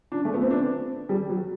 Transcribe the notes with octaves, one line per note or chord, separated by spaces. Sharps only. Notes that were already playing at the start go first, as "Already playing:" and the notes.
D4
A3
B3
C4
D4
G3
F#3